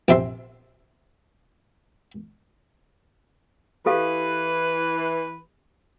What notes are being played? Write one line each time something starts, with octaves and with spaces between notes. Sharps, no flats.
A#1 C3 E5 C6
E3 G4 A4 B4 F5